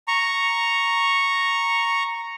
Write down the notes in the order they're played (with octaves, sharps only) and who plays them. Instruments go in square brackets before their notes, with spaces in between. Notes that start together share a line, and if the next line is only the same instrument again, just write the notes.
[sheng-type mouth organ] A#5 C#6